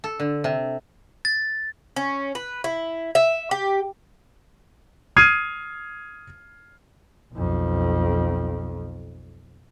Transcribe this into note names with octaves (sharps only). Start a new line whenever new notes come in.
A4
D3
C3
A6
C#4
B4
E4
E5
G4
D#6 F6 G#6 C7 D#7
B1 F2